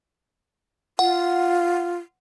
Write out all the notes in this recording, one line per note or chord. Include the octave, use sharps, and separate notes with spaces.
F4 F#5